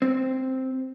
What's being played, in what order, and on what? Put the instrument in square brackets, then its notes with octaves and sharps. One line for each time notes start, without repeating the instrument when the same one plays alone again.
[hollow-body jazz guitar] C4